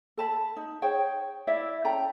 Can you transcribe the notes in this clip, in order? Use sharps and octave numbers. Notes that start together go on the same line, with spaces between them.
A4 A5 B5
D#4
G#4 C5 C#5 G5
E4 D5 E5
C#4 A4 G5 A#5